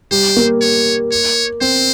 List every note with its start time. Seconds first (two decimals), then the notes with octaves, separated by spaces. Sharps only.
0.11 G3 C5
0.36 A#3
0.61 C#5
1.12 C#5
1.61 C4 C5